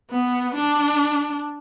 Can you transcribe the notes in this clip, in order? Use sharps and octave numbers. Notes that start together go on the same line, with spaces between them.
B3
D4